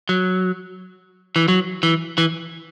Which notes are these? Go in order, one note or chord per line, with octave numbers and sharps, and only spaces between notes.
F#3
E3
F#3
E3
E3